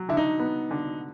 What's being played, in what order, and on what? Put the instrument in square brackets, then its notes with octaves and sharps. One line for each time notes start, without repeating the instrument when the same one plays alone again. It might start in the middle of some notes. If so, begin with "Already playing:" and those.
Already playing: [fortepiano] F#3
[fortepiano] D3 [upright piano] E4
[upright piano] D#4
[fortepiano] B3
D3